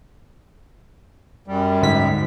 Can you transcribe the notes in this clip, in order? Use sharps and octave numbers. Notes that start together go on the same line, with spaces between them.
F#2 G3
D2 G#2 B6